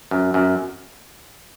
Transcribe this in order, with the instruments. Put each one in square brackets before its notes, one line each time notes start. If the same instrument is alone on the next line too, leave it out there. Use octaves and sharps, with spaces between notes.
[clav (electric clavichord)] F#2
F#2